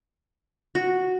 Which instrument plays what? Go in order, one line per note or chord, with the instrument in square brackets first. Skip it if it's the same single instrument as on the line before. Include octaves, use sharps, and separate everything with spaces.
[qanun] F#4